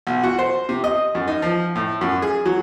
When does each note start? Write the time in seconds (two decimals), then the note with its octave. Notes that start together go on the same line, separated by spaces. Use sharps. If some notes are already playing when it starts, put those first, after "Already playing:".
0.07 B1
0.23 F#4
0.39 C5
0.69 C3
0.84 D#5
1.15 F#2
1.28 D#4
1.42 F3
1.76 A2
2.01 F#2
2.22 G#4
2.46 F#3